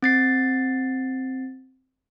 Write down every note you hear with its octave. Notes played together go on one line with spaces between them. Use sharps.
C4 A6 C7